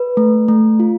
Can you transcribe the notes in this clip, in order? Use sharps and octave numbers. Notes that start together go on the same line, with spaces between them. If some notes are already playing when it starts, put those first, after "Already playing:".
Already playing: B4
A3
A3
F4